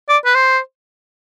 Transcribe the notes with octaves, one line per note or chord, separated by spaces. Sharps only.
D5
B4
C5